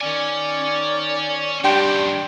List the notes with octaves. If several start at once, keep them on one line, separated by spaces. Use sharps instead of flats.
D#3 C#4 D5 G#5
G2 D#3 D4 G4 G5 C6